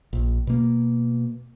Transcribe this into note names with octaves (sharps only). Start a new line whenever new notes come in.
A#1
B2 A#3